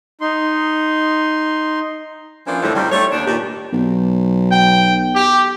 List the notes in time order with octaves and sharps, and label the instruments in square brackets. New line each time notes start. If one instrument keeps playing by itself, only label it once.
[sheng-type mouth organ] D#4 C6
[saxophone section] E3 F3 A#3 C#4 D4
F2 A2 D3 G3 E4
F2 D#3 G3
G3 A3 C#5
D#2 D4
G2 A#2 D#3 G4
[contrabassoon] B1
[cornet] G5
G4